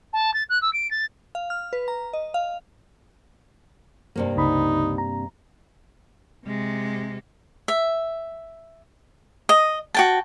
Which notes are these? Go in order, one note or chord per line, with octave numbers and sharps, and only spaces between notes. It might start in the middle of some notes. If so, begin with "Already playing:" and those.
A5
A6
F#6
E6
D7
A6
F5
F6
B4
A#5
D#5
F5
G2 C3 A#3
C#2 C#3 D#4 B5
A#5
C3 G#3
E5
D#5
F#4 G5 A5